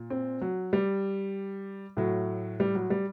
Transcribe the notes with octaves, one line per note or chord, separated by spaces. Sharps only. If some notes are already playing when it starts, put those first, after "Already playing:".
Already playing: A#2
C4
F#3
G3
A2 F#3
G3
F#3
G3